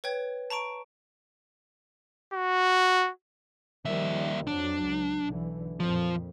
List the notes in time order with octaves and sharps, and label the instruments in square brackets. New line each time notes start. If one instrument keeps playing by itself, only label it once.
[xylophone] B4 C#5 G5 G#6
A5 A#5 C#6 D7
[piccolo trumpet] F#4
[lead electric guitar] D#2 E5 [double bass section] D#3 F3 G3
[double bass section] F2 F#3 [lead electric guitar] D4
[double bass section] C#2
B1 D3 E3
[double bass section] F2 A#2 [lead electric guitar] F3